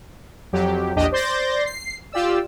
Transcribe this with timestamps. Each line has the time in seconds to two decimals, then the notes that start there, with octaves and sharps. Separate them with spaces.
0.53 F2 F#3 G4
0.96 A#1 E2 D4 G4 D#5
1.12 C5 D5 C6 G6 A6 A#6
1.66 C7
2.12 F4 G4 D5 E6